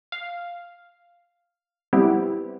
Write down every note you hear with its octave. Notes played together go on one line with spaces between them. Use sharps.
F5
G3 B3 C4 E4 G4